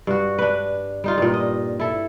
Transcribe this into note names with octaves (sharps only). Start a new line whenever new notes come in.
G2 F#4
D4 B4
G3 D#4 F4
G2 A#2
D#5
E4 A4